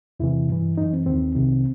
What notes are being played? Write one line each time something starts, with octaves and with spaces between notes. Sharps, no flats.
E2 C3 E3 E4
G2 E3
F#2 E3 D#4
C4
D#2 D#3 C4
C2 C3 D#3